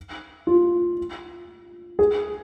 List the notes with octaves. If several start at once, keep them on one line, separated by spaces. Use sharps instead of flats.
F4
G#4